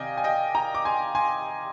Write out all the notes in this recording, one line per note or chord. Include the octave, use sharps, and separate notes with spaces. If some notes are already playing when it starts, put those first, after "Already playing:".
Already playing: C3 D#3 D5 D#5 F5 G5 G#5
G#5
D#5 G5
G5 A#5
D6
G#5 C6
G#5 C6